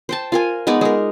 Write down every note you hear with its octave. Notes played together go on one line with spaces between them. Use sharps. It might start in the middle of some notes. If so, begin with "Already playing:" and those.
C5 G5 A5
F4 A#4 G#5
G#3 B3 D#4 D5
G#3 A#4